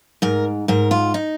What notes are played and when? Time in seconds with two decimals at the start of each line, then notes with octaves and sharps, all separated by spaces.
0.22 G#2 A#4
0.68 G#2 A#4
0.91 F4
1.14 D#4